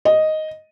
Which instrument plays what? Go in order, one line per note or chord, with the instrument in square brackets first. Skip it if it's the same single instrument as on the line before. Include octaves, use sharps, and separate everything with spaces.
[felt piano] D#5